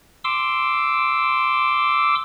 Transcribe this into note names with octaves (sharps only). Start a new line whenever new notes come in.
C6 D6 E6